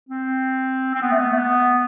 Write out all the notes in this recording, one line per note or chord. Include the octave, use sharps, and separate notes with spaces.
C4
C4
B3
A3
B3
A3
B3